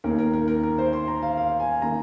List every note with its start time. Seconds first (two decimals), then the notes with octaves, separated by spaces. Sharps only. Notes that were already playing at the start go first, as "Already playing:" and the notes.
0.04 D#2 D#3 A#3 A#4
0.19 A#4
0.34 A#4
0.48 A#4
0.63 A#4
0.78 C5
0.93 C6
1.08 A#5
1.22 F5
1.37 F5
1.60 G#5
1.82 D#3 A#3 A#5